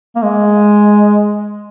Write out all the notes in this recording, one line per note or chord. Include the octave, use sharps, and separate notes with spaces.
A#3
G#3